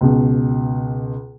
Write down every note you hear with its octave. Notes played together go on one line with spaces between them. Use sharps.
C#2 B2